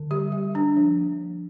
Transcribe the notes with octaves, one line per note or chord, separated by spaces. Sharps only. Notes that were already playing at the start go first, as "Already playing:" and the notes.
Already playing: D3
G3 G4
G3
G3 D4
F3
A#3
F3